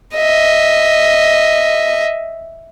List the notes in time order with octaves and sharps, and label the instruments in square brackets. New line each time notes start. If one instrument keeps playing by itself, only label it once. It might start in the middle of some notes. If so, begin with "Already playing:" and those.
[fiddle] D#5 E5